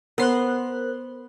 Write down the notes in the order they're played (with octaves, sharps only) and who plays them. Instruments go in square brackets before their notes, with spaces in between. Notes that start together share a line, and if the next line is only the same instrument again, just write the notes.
[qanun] B3 C6 [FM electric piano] A#4 C5 F#6